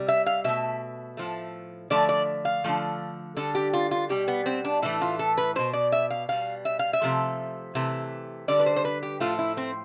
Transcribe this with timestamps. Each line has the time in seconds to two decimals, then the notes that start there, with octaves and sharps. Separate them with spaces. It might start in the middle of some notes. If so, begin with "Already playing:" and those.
Already playing: C3 G3
0.08 E5
0.26 F5
0.44 B2 A3 E5
1.17 A2 F3 A3
1.90 D3 F3 A3 D5
2.09 D5
2.45 F5
2.64 D3 F3 A3
3.37 D3 G3 A4
3.55 G4
3.73 F4
3.91 F4
4.09 B2 G3 G4
4.28 B3
4.46 C4
4.65 D4
4.82 A2 E3 A3 E4
5.01 F4
5.19 A4
5.38 B4
5.56 B2 A3 C5
5.73 D5
5.92 E5
6.10 F5
6.29 B2 G3 F5
6.65 E5
6.79 F5
6.93 E5
7.02 C3 F3 A3
7.75 C3 E3 A3
8.48 D3 G3 D5
8.59 B4
8.66 C5
8.76 C5
8.85 B4
9.03 G4
9.20 A2 F3 A3 F4
9.39 E4
9.57 C4